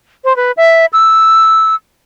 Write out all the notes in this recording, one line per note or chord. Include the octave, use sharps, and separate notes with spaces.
C5
B4
E5
E6